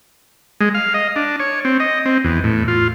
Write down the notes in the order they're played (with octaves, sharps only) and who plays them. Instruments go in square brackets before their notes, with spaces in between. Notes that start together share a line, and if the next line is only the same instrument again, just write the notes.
[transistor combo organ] G#3
F5
D#5
D4
C#5
C4
D#5
C4
E2
A2
F4